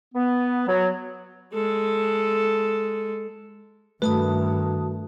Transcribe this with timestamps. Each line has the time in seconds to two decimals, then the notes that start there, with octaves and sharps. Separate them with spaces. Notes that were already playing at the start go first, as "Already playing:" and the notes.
0.15 B3
0.68 F#3
1.53 G#3 A4
4.02 G2 D#3 A3 F#4 B4 A5 D#6